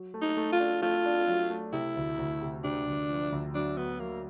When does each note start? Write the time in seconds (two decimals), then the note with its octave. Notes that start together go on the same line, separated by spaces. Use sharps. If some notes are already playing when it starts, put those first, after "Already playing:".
Already playing: F#3
0.14 A3
0.21 D#4
0.37 A3
0.52 F4
0.59 D4
0.82 A3 F4
1.05 D4
1.27 F#3
1.50 A3
1.73 C3 E4
1.96 D2
2.18 D2
2.42 C3
2.64 C3 D4
2.87 D2
3.09 F3
3.32 D2
3.54 F#3 D4
3.77 F#3 B3
4.00 F#3 A#3